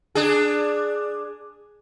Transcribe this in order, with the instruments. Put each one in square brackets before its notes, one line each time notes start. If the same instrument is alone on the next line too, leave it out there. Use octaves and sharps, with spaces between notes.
[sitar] D4 G#4